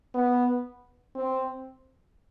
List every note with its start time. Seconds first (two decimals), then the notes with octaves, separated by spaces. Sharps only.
0.14 B3
1.15 C4